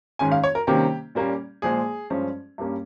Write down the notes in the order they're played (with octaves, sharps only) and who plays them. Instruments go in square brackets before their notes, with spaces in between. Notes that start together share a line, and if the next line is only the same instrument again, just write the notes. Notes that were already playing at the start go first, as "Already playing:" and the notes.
[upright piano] G#2 D#3 G#3 C#4 G#5
F5
C#5
A#4
C3 D#3 G3 A#3 C#4 G4
A#2 G3 A#3 C#4
A#2 F3 G#3 G#4
G2 F3 G#3 C#4
G2 G3 A#3 C#4